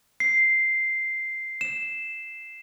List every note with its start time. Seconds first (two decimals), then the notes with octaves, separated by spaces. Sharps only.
0.20 C7
1.61 E7